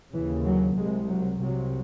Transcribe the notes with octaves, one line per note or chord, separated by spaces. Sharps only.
D#2 C#3 E3
F#3
C2 C3 G#3
F#3
C2 C3 F#3